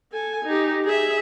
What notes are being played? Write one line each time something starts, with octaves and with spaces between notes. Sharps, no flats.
A4 G#5
D#4 G4
G#4 E5